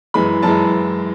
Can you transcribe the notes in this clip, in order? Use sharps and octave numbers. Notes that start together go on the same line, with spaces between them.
F#2 E3 G#3 B5
F#2 E3 G#3 A5